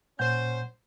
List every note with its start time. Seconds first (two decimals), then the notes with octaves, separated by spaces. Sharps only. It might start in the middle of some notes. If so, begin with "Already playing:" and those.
0.19 A#2 C#4 C5 F#5 G6